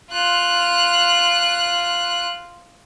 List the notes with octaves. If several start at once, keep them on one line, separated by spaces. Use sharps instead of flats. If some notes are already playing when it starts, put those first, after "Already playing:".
F4 F#6